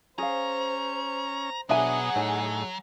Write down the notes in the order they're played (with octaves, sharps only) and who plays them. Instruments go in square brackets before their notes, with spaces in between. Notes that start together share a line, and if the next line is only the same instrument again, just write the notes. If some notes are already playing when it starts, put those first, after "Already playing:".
[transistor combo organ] C#4 [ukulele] G#4 F5 [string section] C5 [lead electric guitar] A#5
[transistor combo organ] B2 D#6 [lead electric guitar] F#3 [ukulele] D4 E5 G#5 [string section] G#4 F#5
[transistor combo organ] A2 [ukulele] D#4 C#5 G#5